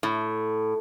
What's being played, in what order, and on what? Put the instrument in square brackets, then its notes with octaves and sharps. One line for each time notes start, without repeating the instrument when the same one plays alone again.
[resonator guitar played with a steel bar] A2